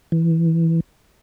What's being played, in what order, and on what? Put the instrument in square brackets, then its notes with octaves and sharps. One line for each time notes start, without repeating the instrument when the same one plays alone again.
[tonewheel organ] E3